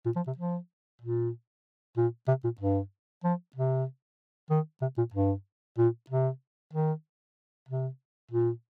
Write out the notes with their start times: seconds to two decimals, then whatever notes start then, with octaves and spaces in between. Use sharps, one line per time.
0.06 A#2
0.16 F3
0.27 C3
0.38 F3
1.02 A#2
1.97 A#2
2.28 C3
2.44 A#2
2.61 G2
3.24 F3
3.56 C3
4.50 D#3
4.82 C3
4.98 A#2
5.14 G2
5.78 A#2
6.10 C3
6.73 D#3
7.69 C3
8.31 A#2